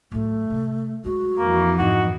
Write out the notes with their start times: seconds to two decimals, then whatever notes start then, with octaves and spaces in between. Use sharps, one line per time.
0.12 A2 F#3 A3
0.50 C3 C#4
1.05 F#3 G#3 F#4
1.38 F2 E3 A#3
1.79 G#2 B3 D#4 F#4